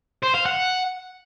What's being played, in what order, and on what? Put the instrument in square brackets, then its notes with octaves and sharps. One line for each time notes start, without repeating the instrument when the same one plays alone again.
[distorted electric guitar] C5
F5
F#5